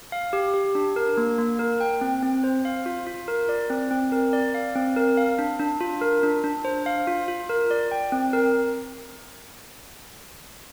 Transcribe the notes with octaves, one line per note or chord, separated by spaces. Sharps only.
F5
G4
G4
D4
A#4
A#3
A#3
A#4
G5
C4
C4
C5
F5
F4
F4
A#4
D5
C4
C4
A#4
D5
F5
C4
A#4
F5
D4
D4
F4
A#4
D4
D4
C5
F5
F4
F4
A#4
D5
G5
C4
A#4